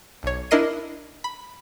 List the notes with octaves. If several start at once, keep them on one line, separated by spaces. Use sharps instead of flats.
B1 C#5
D4 E4 A#4 D#5 C7 D#7
B5